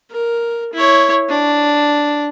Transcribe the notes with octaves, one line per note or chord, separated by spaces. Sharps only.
A#4
E4 C#5
D4